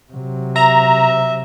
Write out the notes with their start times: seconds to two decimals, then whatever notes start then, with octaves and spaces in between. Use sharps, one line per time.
0.12 C3 F#3
0.56 E5 A#5